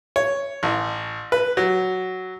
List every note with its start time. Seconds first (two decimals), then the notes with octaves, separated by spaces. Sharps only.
0.16 C#5
0.63 A1
1.32 B4
1.57 F#3